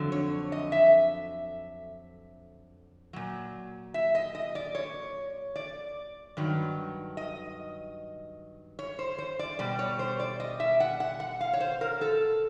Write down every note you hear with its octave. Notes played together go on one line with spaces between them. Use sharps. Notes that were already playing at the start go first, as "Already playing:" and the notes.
Already playing: F2 D3 F#3
C#5
D#5
E5
A#2 F#3
E5
D#5
D#5
D5
C#5
D5
G2 D#3 F#3
D#5
C#5
C5
C5
D5
B2 G3 D5
C#5
C5
D5
D#5
E5
F#5
F#5
F#5
F5
C#5
C5
A#4
A4